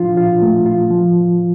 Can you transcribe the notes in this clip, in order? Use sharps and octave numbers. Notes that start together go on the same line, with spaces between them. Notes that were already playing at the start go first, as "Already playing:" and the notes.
Already playing: F3 D4 F4
F4
A3
F4
F3